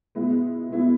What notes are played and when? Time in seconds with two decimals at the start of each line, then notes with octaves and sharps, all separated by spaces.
0.15 B2 G#3 B3 E4
0.69 B2 G#3 B3 E4